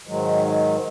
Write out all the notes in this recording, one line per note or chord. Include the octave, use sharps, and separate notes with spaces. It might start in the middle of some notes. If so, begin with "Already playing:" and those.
G#2 D#3 F#3 G#3